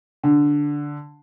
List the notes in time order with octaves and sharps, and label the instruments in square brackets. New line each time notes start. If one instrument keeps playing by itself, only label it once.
[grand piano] D3